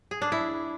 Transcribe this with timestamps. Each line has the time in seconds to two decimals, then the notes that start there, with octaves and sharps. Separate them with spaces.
0.11 G#4
0.22 D4
0.32 E4